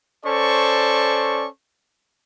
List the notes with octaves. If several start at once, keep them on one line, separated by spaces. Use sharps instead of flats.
C#4 A4 C5 D5 C#6